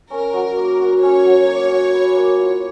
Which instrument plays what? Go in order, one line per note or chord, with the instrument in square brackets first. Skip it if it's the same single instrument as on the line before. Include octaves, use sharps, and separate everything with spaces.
[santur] C#4 [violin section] A#4
[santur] F#3
A#3
F#4
[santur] C#4 [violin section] C#5
[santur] F#3
A#3
F#4
B4
A#3
F4